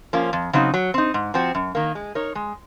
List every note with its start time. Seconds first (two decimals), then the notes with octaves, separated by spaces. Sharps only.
0.13 F3 A#3 C#4 F4
0.33 F2
0.53 C#3 F#3 C4 D#4
0.74 F#3
0.94 C4 D#4
1.14 G#2
1.34 F3 C4 F#4
1.55 F#2
1.75 D#3 A#3
1.95 G#3
2.15 D#4 A#4 C#5
2.35 G#3